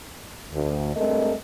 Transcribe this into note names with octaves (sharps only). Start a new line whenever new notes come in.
D2
G2 G#3 A3 C4 A#4 D#5